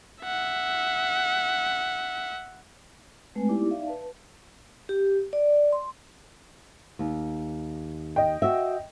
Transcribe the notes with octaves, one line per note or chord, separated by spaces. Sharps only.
E5 F#5
G#3 A3 C4 B4 G#5
B3 D#4 E4 G4 D5 D6
D#4 D5 E5 F5
B4 A5
G4
D5
C6
D#2
D#5 G5
F#4 E5